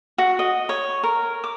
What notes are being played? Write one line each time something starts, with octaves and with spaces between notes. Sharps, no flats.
F#4
D#5
C#5
A#4
D6